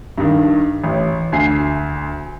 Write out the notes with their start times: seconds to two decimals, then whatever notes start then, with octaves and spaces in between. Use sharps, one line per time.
0.18 G2 D#3
0.84 A1
1.32 D2 G#5 C7